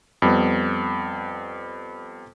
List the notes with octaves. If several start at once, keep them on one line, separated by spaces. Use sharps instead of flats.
F2 G3 B3